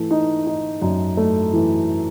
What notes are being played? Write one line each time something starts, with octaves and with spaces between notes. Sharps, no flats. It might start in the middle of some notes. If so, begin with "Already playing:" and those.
Already playing: E3 A3
D#4
D#4
F#2
A3
E3